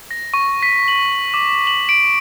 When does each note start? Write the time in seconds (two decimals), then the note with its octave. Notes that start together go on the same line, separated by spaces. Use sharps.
0.11 A#6
0.34 C#6
0.63 B6
0.88 F#7
1.34 D6
1.67 F#7
1.89 D7